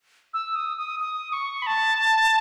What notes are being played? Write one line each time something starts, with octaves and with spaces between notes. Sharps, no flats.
E6
D#6
D#6
D#6
C#6
B5
A5